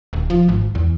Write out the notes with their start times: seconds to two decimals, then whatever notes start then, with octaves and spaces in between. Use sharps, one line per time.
0.13 D#1
0.30 F3
0.49 G#1
0.75 E2